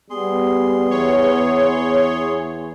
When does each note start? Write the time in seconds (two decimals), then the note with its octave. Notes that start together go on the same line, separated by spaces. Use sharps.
0.10 G3 B3 G#4 C6
0.91 E2 C#5